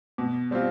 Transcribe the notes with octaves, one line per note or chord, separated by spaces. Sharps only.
B2
G3 C4 F4